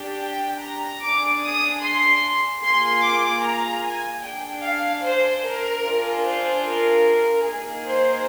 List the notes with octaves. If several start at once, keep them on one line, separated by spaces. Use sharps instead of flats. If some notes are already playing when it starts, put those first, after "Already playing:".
Already playing: D4 G4
G5
A#5
D4 G#4 D6
D#6
C6
A#3 F4 G#4 C6
D6
A#5
G#5
D4 G#4 G5
F5
C5
A#4
D4 F4 G#4
C5
A#4
A#3 D#4 G#4
C5